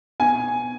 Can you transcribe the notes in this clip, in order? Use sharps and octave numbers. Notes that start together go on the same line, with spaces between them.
B2 G#5